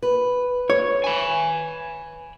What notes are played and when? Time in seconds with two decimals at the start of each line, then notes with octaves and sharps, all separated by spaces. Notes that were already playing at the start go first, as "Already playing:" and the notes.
0.02 B4
0.70 C#5
1.04 G#5 B5